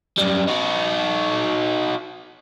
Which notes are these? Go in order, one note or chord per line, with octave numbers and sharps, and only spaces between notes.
F#2 G3
D#4 F#4